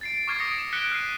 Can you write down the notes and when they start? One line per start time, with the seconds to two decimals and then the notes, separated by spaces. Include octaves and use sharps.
0.01 A6 C7 D7
0.27 C#6 D6 F6 G#6 A6 C7
0.39 D6 D#6 A#6 C#7 D7
0.58 E7
0.73 F#6 B6 C#7 D7 G7
0.92 F6 F#6 C7 D#7